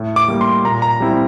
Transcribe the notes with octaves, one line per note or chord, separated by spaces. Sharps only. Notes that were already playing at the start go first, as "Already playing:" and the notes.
Already playing: A2
D6
G3 A#3
C6
A#2 A#5
A#5
G3 C4 E4